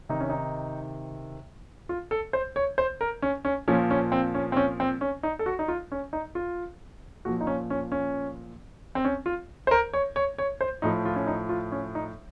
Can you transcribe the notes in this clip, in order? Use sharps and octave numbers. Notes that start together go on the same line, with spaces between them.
C3 D#3 D#4
C#4
D#4
F4
A4
C5
C#5
C5
A#4
C#4
C#4
A#2 F3 C#4
C#4
C4
C#4
C4
C#4
C4
C#4
D#4
A4
F#4
D#4
F4
C#4
D#4
F4
A#2 F3 F#4
D#4
C#4
C#4
C#4
C4
C#4
F4
C5
A#4
C#5
C#5
C#5
C5
A2 F3 D#4
F4
C#4
D#4
F4
C#4
D#4